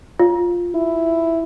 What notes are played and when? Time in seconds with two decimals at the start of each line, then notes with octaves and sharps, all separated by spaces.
0.19 F4
0.75 E4